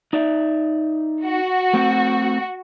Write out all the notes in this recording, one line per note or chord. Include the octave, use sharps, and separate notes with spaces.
D#4 D5 E5
F#4
A3 C4